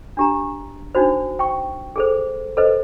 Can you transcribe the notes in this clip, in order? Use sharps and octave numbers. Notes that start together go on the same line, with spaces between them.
D4 G4 A#5
D4 D#4 F#4 C5
G5 C#6
G#4 A4 C5
A4 B4 C5 D#5